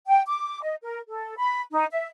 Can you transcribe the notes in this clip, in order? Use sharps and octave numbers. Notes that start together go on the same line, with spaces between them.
G5
D6
D#5
A#4
A4
B5
D#4
E5